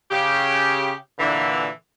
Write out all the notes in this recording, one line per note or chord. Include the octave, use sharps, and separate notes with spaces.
C#3 G4
A#2 D3 E3